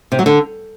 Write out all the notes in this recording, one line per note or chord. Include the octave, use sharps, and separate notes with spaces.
C3
F#3
D3